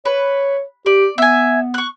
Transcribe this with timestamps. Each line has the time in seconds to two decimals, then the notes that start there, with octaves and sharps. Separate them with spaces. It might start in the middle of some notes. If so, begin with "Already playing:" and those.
0.05 B4 C#5
0.86 G4 D5
1.18 B3 E5 G#5
1.74 C#6 F#6